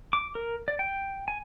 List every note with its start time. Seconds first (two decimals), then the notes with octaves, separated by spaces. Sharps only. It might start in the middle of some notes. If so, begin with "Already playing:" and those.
0.13 D6
0.35 A#4
0.68 D5
0.79 G5
1.28 G#5